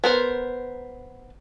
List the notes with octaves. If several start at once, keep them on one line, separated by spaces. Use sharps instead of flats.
B3 A#4 C5